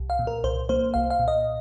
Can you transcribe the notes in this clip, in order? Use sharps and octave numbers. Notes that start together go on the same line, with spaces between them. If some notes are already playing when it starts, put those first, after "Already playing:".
Already playing: C2
F5
A#2
A#4
C2 C5
A#3 C5
C2 F5
F5
A#2
D#5